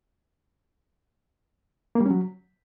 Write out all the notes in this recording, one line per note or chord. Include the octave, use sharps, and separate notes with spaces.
A#3
G3
C#4
F#3